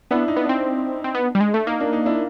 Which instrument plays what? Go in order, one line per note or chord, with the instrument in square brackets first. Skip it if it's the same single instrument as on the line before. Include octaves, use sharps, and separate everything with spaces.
[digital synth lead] B3 [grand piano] D4 E4
[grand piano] D#4
[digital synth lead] B3
[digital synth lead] C4 [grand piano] D4
[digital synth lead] C4
B3
G3
G#3
A3
[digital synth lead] A#3 [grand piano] D#4
[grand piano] D4
D#4
D4 E4